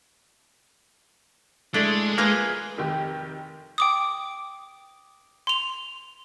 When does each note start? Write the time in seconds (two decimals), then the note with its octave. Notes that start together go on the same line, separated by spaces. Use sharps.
1.74 G#3 A3 D4 E4 D5
2.18 A#3 F4 G#4 B4
2.77 F1 D#3 G4
3.78 G5 D6 D#6
5.47 C6 F7